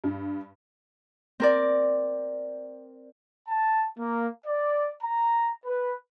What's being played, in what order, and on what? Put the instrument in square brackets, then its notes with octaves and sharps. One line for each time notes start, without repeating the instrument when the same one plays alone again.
[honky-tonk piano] G2
[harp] C4 A#4 D5
[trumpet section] A5
A#3
D5
A#5
B4